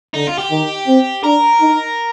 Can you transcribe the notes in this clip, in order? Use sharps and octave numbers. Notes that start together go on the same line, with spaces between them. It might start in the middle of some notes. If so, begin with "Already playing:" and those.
D3 D#4
F4
G4
D#3
C4
D4 A#4
D#4